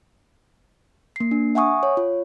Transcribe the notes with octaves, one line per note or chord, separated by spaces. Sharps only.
A#3 C7
D4
E5 F#5 G#5 C#6 D#6
C#5
F4